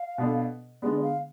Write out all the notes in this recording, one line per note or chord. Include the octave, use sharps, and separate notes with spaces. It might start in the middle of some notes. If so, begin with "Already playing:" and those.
Already playing: F5
B2 B3 D4 A4
D3 G#3 B3 D5
F5